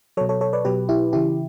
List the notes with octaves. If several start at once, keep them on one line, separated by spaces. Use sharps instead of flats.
B2 F#3 A4 C#5
A4 C#5
A4 C#5
B4 D5
B2 F#3 G4 B4
E4 G4
C#3 E3 E4 G4